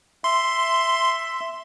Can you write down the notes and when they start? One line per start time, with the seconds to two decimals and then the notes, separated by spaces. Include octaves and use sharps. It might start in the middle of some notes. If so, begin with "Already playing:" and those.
0.24 E5 C6